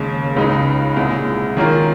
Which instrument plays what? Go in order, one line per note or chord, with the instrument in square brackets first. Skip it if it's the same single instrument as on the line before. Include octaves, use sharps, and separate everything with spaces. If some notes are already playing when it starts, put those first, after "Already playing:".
Already playing: [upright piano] D#2 C#3 G#3
C#2 C#3 G#3 D#4
C2 A#2 G#3
D#3 A#3 C#4 F4 A#4